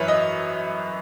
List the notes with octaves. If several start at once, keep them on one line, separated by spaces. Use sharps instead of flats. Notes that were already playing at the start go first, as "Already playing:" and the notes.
Already playing: F#2 E3 B4 C#5
D#5